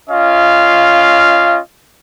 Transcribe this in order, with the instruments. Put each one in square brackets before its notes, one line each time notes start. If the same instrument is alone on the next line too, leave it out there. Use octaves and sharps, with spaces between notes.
[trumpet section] C#4 F4 D#5 F5